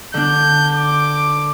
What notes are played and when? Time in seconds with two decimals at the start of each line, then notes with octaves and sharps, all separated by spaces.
0.14 D3 D4 G6
0.76 D6